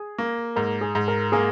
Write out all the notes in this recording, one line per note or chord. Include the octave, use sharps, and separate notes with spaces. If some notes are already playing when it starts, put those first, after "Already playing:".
Already playing: G#4
A#3
G#2 A#4
G#4
G#2
A#4
A#3 G#4